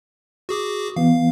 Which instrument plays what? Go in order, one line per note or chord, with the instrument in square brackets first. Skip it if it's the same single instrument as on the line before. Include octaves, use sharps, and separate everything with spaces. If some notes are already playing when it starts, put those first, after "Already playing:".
[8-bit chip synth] F#4 G#4 D6
[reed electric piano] E3 B3 [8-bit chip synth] F5